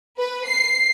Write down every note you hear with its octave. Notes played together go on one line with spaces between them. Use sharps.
B4
C7